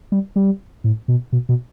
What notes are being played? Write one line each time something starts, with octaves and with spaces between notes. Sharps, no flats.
G3
G3
A2
B2
B2
B2